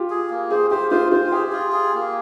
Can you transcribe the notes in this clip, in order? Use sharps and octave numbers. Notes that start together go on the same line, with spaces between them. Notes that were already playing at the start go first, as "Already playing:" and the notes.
Already playing: F4 G4
G#4
A#3
G#4 C5
G4 C5
F4 C5
F4 C5
G4 G#4
F4
G#4
A#3